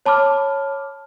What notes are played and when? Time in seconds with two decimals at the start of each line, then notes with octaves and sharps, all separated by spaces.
0.06 C#5 A5 B5 D6 F6